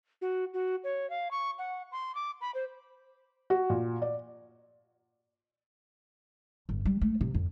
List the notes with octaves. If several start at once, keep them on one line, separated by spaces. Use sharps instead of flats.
F#4
F#4
C#5
F5
C#6
F#5
C6
D6
B5
C5
F#4
A#2
D5
G1
G3
A3
C3
F2